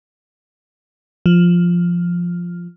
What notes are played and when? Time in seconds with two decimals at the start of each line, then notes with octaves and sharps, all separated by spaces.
1.26 F3